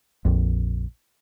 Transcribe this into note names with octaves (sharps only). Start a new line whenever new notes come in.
A#1 F2